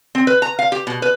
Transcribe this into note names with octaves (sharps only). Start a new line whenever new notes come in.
C4
B4
A#5
F5
G4
B2
B4